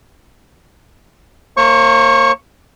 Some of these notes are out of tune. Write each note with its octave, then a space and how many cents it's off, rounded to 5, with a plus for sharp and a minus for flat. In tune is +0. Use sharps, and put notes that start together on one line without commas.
A#3 -20 C5 +45 C#6 +0